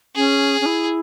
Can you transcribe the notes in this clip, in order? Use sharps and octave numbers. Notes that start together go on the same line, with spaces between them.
C#4 G#4
C#4
E4